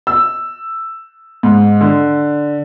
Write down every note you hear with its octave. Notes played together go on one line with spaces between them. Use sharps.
E6
G#2
D3